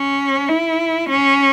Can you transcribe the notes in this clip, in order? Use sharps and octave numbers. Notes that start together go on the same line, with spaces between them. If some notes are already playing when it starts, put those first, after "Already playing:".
Already playing: C#4
E4
C#4